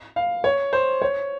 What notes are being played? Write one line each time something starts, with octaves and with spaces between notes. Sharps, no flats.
F5
C#5
C5
C#5